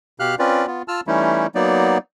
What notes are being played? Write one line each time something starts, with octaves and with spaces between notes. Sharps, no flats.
B2 G4 F5 F6 F#6
C4 C#4 F4 B4 D5
B3 F4
F4 A5 E6 F6
E3 G3 A3 C#4 D#4 E4
F#3 A#3 B3 D#4 D5